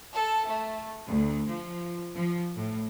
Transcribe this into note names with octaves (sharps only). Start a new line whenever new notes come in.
A4
A3
D2
F3
F3
A2